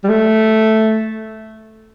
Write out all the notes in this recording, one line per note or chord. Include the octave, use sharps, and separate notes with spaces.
G3
A3